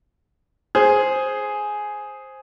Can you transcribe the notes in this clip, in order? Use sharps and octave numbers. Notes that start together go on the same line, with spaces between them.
G#4 C5